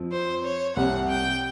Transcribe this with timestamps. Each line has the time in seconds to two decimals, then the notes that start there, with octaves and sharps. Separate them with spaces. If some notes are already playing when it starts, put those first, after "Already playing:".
Already playing: F2 F3
0.12 C5
0.44 C#5
0.76 C2 C3 F#5
1.09 G5